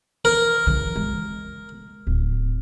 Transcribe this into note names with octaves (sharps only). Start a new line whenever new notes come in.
A#4
C#3 E3
G#3
D1